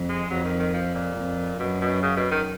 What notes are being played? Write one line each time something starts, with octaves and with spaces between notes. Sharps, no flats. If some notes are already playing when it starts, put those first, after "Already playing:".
Already playing: F2
G#3
F2 F#3
D#3
D#3
F3
A#2
F2
F#2 B2
B2
C#3
B2
D#3